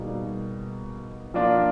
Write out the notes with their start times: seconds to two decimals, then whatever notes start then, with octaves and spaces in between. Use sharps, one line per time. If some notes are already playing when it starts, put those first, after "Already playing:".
Already playing: B2 G3 A#3 D#4 G#4
1.34 F3 A#3 D4 F4